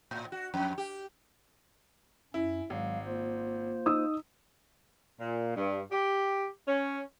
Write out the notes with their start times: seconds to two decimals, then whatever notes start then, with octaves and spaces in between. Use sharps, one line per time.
0.11 A2
0.32 F#4
0.54 F2
0.78 G4
2.34 F#2 C#4 E4
2.70 G#1 F#3 G#3 F5
3.06 A#3 F4 C5
3.86 D#4 D#6 E6
5.21 A#2
5.57 G2
5.92 G4
6.68 C#4